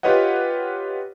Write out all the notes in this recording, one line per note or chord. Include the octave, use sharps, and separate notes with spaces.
F4 G4 B4 C#5 D#5 F#5